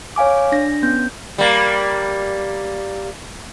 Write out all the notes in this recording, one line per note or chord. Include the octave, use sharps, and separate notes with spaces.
C#5 F5 G#5 D6
D4 A#6
B3 C#4 G6
G3 A#3